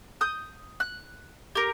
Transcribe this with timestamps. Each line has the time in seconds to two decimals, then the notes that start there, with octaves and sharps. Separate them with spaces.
0.21 D#6 G6
0.80 F#6
1.55 G4 A#4